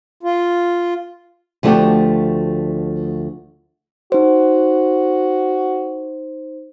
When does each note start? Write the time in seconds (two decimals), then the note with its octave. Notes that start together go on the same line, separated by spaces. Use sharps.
0.23 F4
1.63 D2 F3 A3 D4 F#4 G4
4.12 D#4 F#4 C5